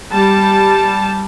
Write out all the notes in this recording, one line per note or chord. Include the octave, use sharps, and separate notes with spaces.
G3 A5